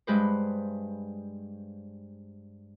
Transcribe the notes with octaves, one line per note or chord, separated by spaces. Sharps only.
G2 G#3 B4 C5